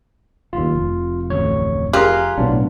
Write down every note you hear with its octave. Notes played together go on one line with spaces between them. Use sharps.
F#1 D#2 F4
F1
A1 D2 C#5
F4 G4 G#4 A#4 G#5 F#6
B1 A2 F#3 B3 D4